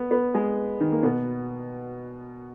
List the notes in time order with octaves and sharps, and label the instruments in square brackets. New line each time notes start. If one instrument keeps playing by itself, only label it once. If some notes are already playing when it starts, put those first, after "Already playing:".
Already playing: [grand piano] B3 B4
B3 B4
G#3 G#4
D#3 D#4
A#3
B2 B3